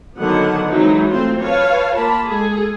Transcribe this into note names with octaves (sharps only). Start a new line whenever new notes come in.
D3 D#3 F#3 B3 F#5
E3 F#3 G#3 C4 D#4 E4
A3 C4 F4 C5
B4 C#5 F5 A5
A#3 F4 A#4 A5 B5
G#3 G#4 A4